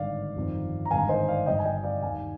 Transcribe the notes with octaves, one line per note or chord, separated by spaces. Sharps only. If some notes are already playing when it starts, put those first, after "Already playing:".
Already playing: G#1 G2 D3 D5 F5
G1 F2 D#3
A#5
G#1 G2 D3 F5 G#5
C5 D#5
D5 F5
G1 G2 D3 D#5 G5
G#5
D#5 G5
D5 F5
D#2 D#3 F5 G#5